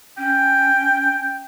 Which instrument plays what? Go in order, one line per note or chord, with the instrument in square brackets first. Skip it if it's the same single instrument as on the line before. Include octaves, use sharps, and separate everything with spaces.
[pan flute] C#4 [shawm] G5